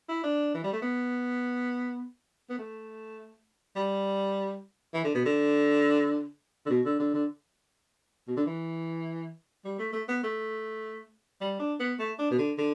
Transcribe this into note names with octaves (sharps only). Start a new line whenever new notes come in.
E4
D4
E3
G3
A3
B3
B3
A3
G3
E3
D3
B2
D3
D3
B2
D3
D3
D3
B2
D3
E3
G3
A3
A3
B3
A3
G3
D4
B3
A3
D4
B2
D3
D3